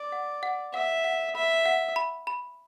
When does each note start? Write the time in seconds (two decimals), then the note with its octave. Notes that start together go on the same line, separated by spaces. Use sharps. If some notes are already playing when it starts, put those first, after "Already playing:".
Already playing: D5
0.12 F#5
0.43 F#5
0.74 E5 F#5
1.04 F#5
1.35 E5 B5
1.66 F#5
1.96 B5
2.27 B5